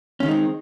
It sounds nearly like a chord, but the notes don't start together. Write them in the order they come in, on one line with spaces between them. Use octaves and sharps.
C#4 D#3 G#3 D#4 C4